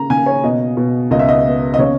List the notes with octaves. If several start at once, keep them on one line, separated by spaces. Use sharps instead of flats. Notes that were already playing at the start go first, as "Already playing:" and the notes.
Already playing: C#3 A#5
C#3 G#5
C#5
B2 D#5
B2
C#2 D#5
E5
D#5
B3
D#5
C#3 C#5